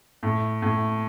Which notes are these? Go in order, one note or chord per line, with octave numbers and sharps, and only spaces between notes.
A2
A2